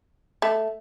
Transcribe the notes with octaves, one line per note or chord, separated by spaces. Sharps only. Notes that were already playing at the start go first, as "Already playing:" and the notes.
A3